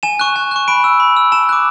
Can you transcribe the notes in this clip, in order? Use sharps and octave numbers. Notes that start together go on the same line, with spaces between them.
G#5 E7
C#6 F#6
G#5
C#6 F#6
B5 D7
E6
B5
E6
A5 E7
D6 F#6